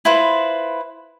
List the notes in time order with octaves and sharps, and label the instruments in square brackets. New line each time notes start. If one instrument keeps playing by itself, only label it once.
[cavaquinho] E4 F4 B4 C5